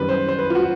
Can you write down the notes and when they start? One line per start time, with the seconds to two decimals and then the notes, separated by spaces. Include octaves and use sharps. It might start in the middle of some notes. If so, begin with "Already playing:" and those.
Already playing: F#2 D#3 G3 C4 B4
0.09 C5
0.29 C5
0.39 B4
0.50 F4
0.55 F#4